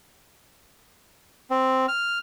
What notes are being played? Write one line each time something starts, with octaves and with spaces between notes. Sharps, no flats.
C4
F6